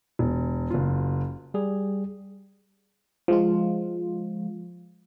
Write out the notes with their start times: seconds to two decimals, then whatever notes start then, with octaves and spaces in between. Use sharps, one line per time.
0.19 E1
0.70 F#1 F4
1.54 G3 G#4
3.28 F3 G#3 F4